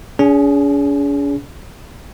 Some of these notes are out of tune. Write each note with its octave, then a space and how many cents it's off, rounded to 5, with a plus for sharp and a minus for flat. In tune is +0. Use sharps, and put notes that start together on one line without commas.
C#4 +45 G#4 +0